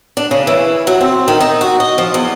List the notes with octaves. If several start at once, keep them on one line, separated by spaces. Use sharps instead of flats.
D4
C#3
E3
F#3
C4
D#3
D#4
F#4
D#5
F3
E2